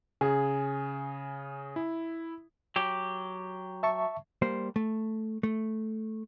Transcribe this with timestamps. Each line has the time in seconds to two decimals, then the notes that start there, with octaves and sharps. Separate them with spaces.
0.21 C#3 G#4
1.76 E4
2.76 F#3 G4
3.83 E5 A5 C#6
4.42 G3 A#3 C5
4.76 A3
5.43 A3